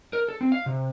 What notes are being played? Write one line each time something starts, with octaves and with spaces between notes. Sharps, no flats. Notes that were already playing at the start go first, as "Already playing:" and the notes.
A#4
A4
C4
F5
C3